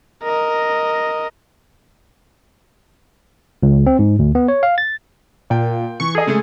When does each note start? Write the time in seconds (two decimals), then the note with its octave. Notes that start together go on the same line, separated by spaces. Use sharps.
0.23 A#4 D#5
3.63 C#2
3.86 C4
3.99 G#2
4.19 D2
4.35 B3
4.48 C#5
4.63 F5
4.78 A6
5.50 A#2 F4 G5
6.00 E3 C#6
6.15 G#4 A4 D#5
6.27 C#3 G#3 A3